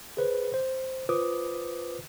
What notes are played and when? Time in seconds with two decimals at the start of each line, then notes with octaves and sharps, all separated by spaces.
0.17 G#4 B4 C5
0.54 C5
1.09 F4 B4 C5 D6 D#6